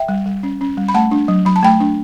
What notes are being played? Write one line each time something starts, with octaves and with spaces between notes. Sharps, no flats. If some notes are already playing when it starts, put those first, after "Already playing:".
Already playing: E5 G5
G3
G3
C#4
C#4
G3
B5
A3 F#5 A5
D4
F#3
F#3 B5
A5
A3 G5 B5
D4